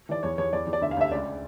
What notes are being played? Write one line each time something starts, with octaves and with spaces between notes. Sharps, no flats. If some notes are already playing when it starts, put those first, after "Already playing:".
E3 D5
E2 C#5
E2 C#5
E2 D5
E2
D5
D2 E5
F5
D2 E5
C#2 D5